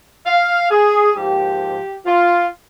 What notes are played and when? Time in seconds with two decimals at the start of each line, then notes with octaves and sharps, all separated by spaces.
0.26 F5
0.71 G#4
1.15 G#2 F3 A#3 G4
2.06 F4